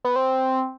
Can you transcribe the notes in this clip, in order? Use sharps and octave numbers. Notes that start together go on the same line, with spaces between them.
B3
C4